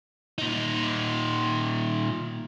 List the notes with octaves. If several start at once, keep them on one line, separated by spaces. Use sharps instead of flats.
A#2 D#4